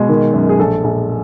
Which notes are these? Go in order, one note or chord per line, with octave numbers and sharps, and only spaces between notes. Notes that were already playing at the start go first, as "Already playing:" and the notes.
Already playing: B2 G#3
D#3
F#2
G#4
A#1 A4
A#1